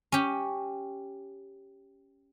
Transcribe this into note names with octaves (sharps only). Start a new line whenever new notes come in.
C#4 G4